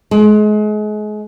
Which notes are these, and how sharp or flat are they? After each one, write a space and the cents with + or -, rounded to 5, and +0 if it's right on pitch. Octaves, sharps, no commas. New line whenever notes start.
G#3 +30